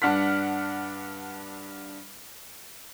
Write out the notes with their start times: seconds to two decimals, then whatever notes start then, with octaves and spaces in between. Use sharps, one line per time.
0.02 G2 D4 F#5 F6 B6